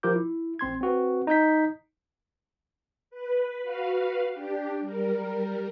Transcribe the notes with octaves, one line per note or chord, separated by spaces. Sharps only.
F3 F4 G4 A#4 D6 G6
E4
A1 C4 C6 G#6
C4 F#4 B4
D#4 D#5 G6 B6
B4
F#4 B4 F5
D4 G4
G3 A#4